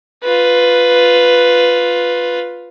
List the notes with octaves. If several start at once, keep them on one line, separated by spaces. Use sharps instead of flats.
F4 B4